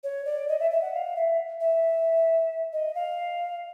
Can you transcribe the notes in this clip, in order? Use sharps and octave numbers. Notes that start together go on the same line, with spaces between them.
C#5
D5
D#5
E5
E5
F#5
F5
E5
E5
D#5
F5